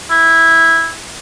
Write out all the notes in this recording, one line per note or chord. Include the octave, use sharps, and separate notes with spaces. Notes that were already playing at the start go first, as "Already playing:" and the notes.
E4